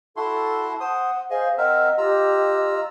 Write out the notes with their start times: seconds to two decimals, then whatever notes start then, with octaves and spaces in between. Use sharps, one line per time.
0.17 E4 F#4 A4 A5 C6
0.80 C5 F#5 D#6
1.30 G#4 C5 D#5 F5
1.58 C4 A#4 D#5 E5 F#5
1.98 F4 G4 A#5 E6